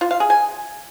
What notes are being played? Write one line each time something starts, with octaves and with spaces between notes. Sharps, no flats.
F4
F5
G#4
G#5